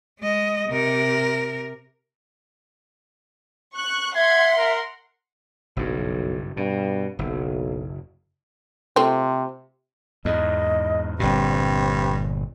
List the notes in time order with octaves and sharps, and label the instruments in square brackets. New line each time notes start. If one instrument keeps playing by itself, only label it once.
[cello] G#3 D#5
C3 A#4
[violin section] C#6 F#6
[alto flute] E5 [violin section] F#5 C6 [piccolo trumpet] G#6
[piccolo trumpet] A#4
[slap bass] F#1 G2 [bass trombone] B1
[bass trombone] G2 [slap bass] B2
[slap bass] F#1 [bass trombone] B1
[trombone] C3 [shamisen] A3 C4 F4
[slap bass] E2 G#2 [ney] D#5
[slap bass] G1 A#2 [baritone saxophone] G2 [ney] C4